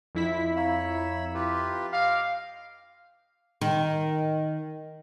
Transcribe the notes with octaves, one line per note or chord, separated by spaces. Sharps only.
F2 E4 B6
C#5 F5 A#5 B5 E6
F4 G4 B4
D#5 F5 G5 D6
D#3